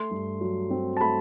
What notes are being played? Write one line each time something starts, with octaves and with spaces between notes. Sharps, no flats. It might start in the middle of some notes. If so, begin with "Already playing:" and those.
Already playing: A3 C6
G2
F#3
C4
A5
A3 B5